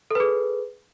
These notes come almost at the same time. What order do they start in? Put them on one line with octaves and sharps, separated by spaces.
A4 B4 G#4